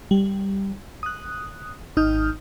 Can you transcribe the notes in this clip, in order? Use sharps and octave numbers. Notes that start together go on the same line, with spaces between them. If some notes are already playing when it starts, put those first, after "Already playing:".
G3
D#6 F#6
G#1 D#4 D#6 F6 G6